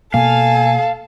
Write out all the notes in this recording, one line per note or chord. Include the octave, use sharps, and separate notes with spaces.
B2 A#3 A4 F5 G#5